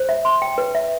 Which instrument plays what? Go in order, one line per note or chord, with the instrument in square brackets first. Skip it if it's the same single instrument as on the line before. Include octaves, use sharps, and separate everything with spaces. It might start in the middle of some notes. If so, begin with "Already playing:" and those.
Already playing: [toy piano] C5
E5
C6
G5
B4
E5